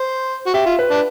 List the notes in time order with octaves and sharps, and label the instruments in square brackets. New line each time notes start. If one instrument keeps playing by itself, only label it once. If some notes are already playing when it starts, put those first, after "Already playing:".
Already playing: [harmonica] C5
F#4
[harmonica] G4 [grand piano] E5
[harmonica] F4
[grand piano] B4
[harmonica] D4